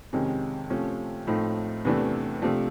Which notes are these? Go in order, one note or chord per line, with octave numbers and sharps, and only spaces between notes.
F2 C3 D#3 G#3 C#4
C3 F3 A3 C#4
A2 F3 A3 C4 D#4
E2 C3 E3 A3 D4
C3 F3 A3 D4